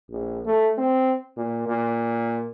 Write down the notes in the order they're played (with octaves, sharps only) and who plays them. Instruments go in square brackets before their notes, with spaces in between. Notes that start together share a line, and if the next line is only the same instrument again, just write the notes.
[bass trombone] A#1
A3
C4
A#2
A#2